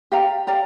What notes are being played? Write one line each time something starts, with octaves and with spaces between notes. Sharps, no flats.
G4 D5 F5 A#5
G4 D5 F5 A#5